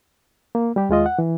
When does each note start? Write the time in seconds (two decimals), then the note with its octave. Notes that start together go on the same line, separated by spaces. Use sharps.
0.55 A#3
0.76 G3 G4
0.89 D#2 G#3 F4 D#5
1.06 F#5
1.19 E3